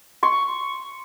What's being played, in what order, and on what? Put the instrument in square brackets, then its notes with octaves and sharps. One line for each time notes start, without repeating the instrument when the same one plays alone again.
[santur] C6 C#6